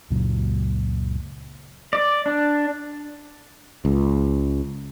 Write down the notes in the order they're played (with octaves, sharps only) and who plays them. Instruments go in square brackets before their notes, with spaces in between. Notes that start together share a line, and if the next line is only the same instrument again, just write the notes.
[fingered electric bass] C#2 F#2 A#2 F#3
[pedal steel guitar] D5
D4
[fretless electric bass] C#2